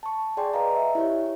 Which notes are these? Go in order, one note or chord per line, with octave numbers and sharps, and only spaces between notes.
A5 C#6
G#4 D5 G5 G#5 C6
B4 D#5 F5 A#5
E5
E4 G4 C#5